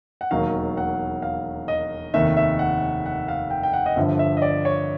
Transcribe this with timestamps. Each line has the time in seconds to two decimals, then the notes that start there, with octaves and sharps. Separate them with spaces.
0.21 F#5
0.31 E1 D#2 D#3 F#3 F5
0.77 F#5
1.22 F5
1.68 D#5
2.14 F1 D#2 D#3 E5
2.37 E5
2.59 F#5
3.06 F#5
3.28 F5
3.50 G5
3.63 G5
3.73 F#5
3.86 D#5
3.96 G1 G2 D3 F3 E5
4.19 E5
4.37 D#5
4.42 D5
4.65 C#5